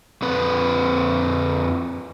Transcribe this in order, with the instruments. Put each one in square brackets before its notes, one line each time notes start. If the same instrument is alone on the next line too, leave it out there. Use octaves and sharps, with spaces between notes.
[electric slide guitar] F2 C4 B4